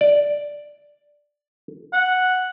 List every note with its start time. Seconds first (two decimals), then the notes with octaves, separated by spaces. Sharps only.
0.01 D5
1.93 F#5